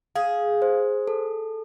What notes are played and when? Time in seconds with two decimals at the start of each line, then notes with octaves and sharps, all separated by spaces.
0.15 G#4 F5
0.62 C5
1.08 A4